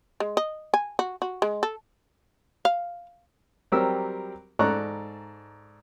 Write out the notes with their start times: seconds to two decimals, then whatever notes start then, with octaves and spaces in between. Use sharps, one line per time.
0.20 G#3
0.37 D#5
0.74 G#5
0.99 F#4
1.22 F#4
1.42 G#3
1.63 A4
2.65 F5
3.72 F#3 G3 C4 G4 A#4 E6
4.59 G#2 A4 D5 A#5 C#6 F#6